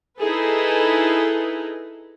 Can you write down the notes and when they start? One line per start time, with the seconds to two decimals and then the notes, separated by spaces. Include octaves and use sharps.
0.19 D#4 E4 G#4 A4 B4